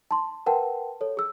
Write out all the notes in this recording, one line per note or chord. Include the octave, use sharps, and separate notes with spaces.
A5 C6
A#4 B4 F#5 G5 A5
A4 C#5
G#4 E6